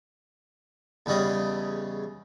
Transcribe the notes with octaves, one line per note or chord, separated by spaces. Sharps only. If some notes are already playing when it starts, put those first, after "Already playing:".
E2 C#3 G3 C#4 D#5